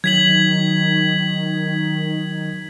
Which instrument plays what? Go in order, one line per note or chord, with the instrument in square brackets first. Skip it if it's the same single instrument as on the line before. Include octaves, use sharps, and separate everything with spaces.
[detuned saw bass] D#3 [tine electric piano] F#3 [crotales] G#6 B6 F#7